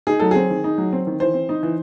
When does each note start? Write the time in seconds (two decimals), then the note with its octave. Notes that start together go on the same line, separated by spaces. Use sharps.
0.07 D#4 G#4
0.19 F#3 A4
0.31 C4 G#4
0.50 D#3
0.64 D#4
0.78 F#3
0.93 C4
1.07 D#3
1.20 E3 C5
1.34 C4
1.49 D#4
1.63 E3